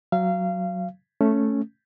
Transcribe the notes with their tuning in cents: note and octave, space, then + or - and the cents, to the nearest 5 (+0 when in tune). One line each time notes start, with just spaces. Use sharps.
F#3 +0 F5 -25
A3 +0 C#4 +0